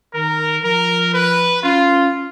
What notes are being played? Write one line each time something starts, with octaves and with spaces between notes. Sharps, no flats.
D#3 A#4
F3 A#4
B4
C#4 F4